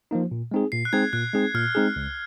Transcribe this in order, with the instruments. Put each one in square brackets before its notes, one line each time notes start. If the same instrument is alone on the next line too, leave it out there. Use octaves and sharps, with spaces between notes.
[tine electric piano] F3 A#3 D#4
A#2
G#3 C4 D#4 G#4
[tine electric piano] A#2 [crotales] C7
[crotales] F#6
[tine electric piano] G#3 C4 D#4 G#4 [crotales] G#6
[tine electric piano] A#2 [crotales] F#6
[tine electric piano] G#3 C4 D#4 G#4
[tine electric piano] A#2 [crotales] F6
[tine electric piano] G#3 C4 D#4 G#4
C#2